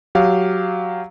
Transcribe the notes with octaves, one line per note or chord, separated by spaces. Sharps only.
F#3 G4 F5